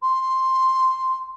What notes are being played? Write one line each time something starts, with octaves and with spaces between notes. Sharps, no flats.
C6